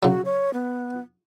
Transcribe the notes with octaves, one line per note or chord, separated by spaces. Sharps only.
C#3 F#3 F#4
C#5
B3